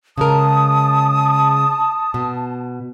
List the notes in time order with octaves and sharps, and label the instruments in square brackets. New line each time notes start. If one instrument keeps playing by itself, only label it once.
[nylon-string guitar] C#3 G#3 A#4 [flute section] A5 [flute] D#6
[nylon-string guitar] B2